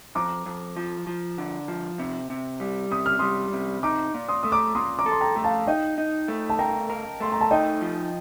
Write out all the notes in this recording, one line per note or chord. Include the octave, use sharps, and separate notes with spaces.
F2 A#5 D6
F2
F3
F3
D3
F3
C3
C3
G3
C3 D#6
F6
G3 C6 D#6
C3
D#4 A#5 D6
A#2
C6 D#6
A3 D#6
A#5 D6
A#2 C6 D#6
A#5 D6
A4
C6
G5 A#5
A3
F5 A5
D#4 D#5 G5
D#4
A3
A5
A#4 G5 A#5
A#4
A3 C6
A#5
A5
D#4 D#5 G5
F3